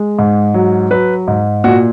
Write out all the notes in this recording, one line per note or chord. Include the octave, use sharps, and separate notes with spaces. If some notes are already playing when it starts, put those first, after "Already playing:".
Already playing: G#3
G#2
F#3
F#3 B4
G#2
A#2 F#4